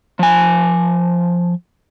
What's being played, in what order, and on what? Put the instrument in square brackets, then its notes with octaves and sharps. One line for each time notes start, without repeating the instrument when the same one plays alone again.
[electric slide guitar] F3 G#5